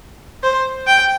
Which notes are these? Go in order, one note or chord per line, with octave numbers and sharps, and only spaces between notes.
C5
G5